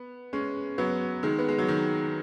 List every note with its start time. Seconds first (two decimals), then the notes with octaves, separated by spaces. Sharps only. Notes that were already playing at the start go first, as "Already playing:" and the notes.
Already playing: B3
0.33 G#3 C#4
0.78 F#3 B3
1.23 D#3 G#3
1.39 B3
1.48 G#3
1.58 F#3
1.68 D#3